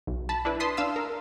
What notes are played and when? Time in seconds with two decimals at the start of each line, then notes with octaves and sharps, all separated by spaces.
0.07 B1
0.29 A5 B5
0.45 D4 E4 B4
0.60 A5 C6 D#6 B6 C7
0.77 D4 F5 E6
0.96 A#4